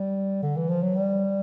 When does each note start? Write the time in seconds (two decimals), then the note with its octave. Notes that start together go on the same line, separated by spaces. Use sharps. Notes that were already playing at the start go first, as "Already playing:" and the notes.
Already playing: G3
0.43 D3
0.57 E3
0.70 F3
0.82 F#3
0.96 G3